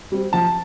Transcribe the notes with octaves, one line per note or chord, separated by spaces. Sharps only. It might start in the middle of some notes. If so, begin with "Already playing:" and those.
G3 C4
F3 A5